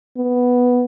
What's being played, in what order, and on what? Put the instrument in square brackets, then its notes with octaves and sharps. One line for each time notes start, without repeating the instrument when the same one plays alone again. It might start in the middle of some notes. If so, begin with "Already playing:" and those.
[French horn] B3